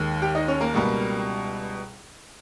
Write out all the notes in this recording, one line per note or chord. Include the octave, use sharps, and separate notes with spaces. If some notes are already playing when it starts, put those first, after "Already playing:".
Already playing: D#2 D#3 G#3
G4 G5
D#4 D#5
C#4 C#5
A#3 A#4
C#2 B2 G3